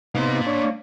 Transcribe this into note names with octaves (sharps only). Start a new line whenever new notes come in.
C3 A#3 B3 D#4 C6
D4 C#5